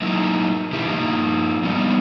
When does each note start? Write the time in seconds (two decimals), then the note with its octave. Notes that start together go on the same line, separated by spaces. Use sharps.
0.01 F#3 A#3 D#4 E4
0.72 B2 E3 A#3 E4 G4
0.86 F3 A#3 D#4
1.64 G3 B3 C#4 D#4